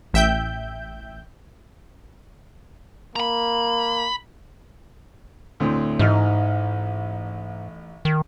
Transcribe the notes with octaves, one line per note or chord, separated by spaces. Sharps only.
A1 E5 G5 G6
A#3 A#5 B5
D2 A2 C4
A1 G#2 D#4 F6
D#3